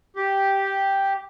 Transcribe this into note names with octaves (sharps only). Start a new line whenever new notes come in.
G4